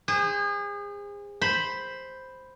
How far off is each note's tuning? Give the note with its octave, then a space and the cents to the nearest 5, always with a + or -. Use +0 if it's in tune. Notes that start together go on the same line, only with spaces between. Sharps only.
G#4 -35 C5 +0
C5 +0 B5 +0